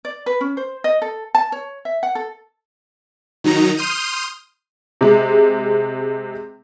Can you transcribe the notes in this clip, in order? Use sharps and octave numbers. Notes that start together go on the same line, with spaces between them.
D5
B4
C#4
C5
D#5
A4
A5
C#5
E5
F#5
A4
D#3 F#3 D#4 A#5
C6 D#6 F6 G6 D#7
C3 G#3